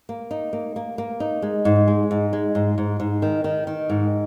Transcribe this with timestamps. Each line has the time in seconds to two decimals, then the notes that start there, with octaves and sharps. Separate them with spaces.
0.09 A#3
0.31 D#4
0.53 A#3
0.76 A#3
0.98 A#3
1.20 D#4
1.42 G#3
1.65 G#2
1.88 G#3
2.11 G#2
2.33 G#3
2.55 G#2
2.78 G#2
3.00 G#2
3.22 D#3
3.44 D#3
3.67 D#3
3.90 G#2